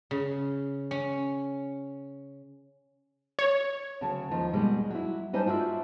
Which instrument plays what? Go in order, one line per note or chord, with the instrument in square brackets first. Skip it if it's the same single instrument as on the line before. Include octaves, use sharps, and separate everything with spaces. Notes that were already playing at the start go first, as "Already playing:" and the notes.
[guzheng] C#3
C#4
[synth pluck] C#5
[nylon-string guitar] D2 C#3 F#3 A5
D#2 F3
B2 G3 G#3
F#3 E4
G3 D#4 C5 C#5 G#5 A5
D4 F4 F#4 C#5 E5